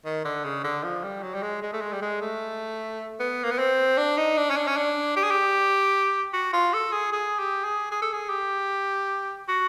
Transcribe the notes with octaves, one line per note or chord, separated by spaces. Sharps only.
D#3
D3
C#3
D3
F3
G3
F#3
G3
G#3
G#3
A3
G#3
G3
G#3
A3
B3
A#3
B3
C4
D4
D#4
D4
C#4
D4
C#4
D4
G4
G#4
G4
F#4
F4
A4
G#4
G#4
G4
G#4
G#4
A4
G#4
G4
F#4